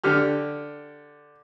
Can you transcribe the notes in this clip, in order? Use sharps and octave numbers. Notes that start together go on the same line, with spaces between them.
D3 G4 F6